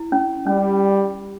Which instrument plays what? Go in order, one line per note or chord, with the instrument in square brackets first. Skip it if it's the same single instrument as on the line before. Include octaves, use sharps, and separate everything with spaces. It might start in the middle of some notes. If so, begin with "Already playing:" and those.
Already playing: [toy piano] E4
C#4
[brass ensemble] G3 [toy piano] C#4